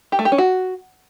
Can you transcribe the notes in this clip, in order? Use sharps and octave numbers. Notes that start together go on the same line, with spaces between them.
G4
A3
G4
C#4
F#4